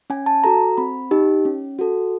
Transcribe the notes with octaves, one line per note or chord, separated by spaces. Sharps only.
C#4 G#5
A5
F#4 A4 A#5
C4 B5
D#4 G4
C#4
F#4 A4